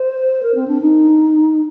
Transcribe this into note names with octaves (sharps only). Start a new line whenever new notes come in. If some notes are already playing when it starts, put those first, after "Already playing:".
Already playing: C5
A#4
C4
D4
D#4